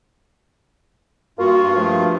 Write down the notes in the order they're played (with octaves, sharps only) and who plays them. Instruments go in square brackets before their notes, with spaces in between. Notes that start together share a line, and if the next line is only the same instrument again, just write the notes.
[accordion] G2 F4 [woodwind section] A#3 F#4
[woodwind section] F3 A3